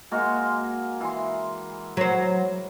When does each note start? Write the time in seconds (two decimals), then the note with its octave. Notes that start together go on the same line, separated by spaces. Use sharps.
0.11 G#3 A#3 F#4
1.00 E3 C6
1.97 F#3 C5